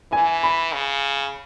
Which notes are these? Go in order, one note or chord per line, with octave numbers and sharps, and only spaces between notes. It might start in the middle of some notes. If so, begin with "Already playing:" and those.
E3 G#5
B5
C#3